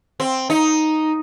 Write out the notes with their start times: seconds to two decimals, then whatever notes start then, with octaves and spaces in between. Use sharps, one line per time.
0.20 C4
0.50 D#4